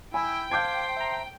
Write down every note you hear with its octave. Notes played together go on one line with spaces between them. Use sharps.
E4 G5 G#5 B5
C5 F5 A5 D6 G6 G#6
E5 A#5